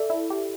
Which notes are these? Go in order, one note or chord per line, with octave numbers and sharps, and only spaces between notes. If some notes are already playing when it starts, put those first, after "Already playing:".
Already playing: A4 D5 E5
E4
G4